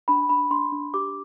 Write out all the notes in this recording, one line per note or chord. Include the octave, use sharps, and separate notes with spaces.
D4 B5
D4 B5
D4 C6
D4
G4 D6